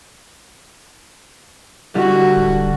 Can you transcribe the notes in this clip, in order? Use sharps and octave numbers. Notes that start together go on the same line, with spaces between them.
D3 G3 F#4
D1